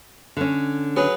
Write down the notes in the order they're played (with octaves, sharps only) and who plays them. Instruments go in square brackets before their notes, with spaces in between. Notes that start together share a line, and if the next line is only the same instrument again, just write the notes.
[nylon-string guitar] D3 C#4
[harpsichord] F#3 G#4 B4